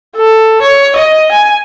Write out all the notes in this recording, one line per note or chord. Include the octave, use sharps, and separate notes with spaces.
A4
C#5
D#5
G#5